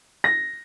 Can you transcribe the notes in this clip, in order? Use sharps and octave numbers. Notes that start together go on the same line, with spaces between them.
A#6